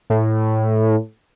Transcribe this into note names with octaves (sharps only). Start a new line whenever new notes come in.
A2